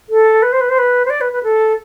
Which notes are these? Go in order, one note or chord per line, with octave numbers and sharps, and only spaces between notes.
A4
B4
C5
B4
C5
B4
C5
D5
B4
B4
A4